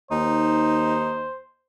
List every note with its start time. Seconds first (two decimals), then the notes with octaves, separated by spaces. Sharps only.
0.11 D#2 D#4 C5